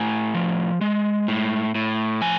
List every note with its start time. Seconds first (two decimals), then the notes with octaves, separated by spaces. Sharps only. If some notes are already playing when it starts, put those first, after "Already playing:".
Already playing: A2 G#5
0.34 F3
0.81 G#3
1.28 A2
1.75 A2
2.22 F3 G#5